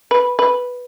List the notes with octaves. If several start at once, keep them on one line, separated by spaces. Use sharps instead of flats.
B4
B4